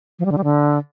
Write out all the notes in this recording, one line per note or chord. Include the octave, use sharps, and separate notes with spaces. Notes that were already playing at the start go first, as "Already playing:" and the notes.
F3
G3
D3
G3
D3